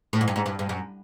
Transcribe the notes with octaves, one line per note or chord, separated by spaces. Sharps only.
A2
G#2
G2
G#2
G2
G2
F#2